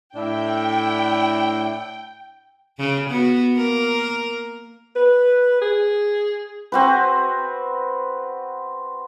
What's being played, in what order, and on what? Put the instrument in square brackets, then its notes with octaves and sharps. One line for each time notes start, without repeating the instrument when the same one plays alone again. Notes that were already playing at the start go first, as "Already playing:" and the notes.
[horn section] A2 D4 E5 [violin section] G5
[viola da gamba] C#3
B3 F#4
A#3 A#4
[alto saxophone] B4
G#4
[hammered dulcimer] C4 F#4 B4